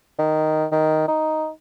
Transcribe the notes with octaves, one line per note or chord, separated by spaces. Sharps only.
D#3
D#3
D#4